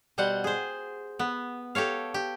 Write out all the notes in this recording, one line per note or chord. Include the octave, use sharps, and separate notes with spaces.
B2 G3 C5 F#5
G#4 C5
B3
G4 A4 C#5 F5
G4